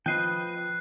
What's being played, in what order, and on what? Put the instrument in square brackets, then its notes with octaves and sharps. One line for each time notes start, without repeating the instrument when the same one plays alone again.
[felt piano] F3 [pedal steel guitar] B4 D#5 G5 [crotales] F#6 C7